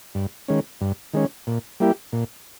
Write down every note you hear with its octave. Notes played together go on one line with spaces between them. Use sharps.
G2
D#3 G#3 C#4
G2
D#3 G#3 C#4
A#2
G3 A#3 E4 G4
A#2